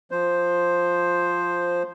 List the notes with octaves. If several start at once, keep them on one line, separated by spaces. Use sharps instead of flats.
F3 C5